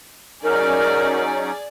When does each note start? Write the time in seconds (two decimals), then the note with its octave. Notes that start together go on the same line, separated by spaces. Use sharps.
0.44 F#3 C#4 D#4 G#4 A#4 D5